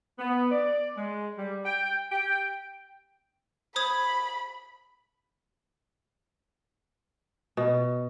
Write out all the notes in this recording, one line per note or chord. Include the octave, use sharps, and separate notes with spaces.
B3
D5
G#3
G3
G5
G5
C5 B5 D#6 G#6
B2